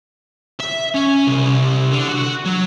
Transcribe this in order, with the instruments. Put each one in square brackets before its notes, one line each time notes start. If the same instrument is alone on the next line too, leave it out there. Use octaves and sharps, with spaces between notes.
[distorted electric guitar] E5
C#4
C2
D3
F#4
F#3